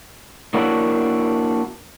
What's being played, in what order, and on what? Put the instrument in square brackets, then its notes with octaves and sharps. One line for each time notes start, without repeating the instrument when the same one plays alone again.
[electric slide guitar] A#3 D4 E4 F#4 A#4 C#5